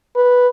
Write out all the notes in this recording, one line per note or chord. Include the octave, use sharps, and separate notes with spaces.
B4